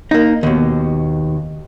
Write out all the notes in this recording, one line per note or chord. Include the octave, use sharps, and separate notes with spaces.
A#3 D#4
D#2 B2